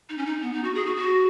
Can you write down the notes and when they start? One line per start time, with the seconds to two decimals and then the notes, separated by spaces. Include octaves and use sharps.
0.09 D#4
0.18 C#4
0.26 D#4
0.42 B3
0.53 D#4
0.64 F#4
0.75 G#4
0.86 F#4
0.96 F#4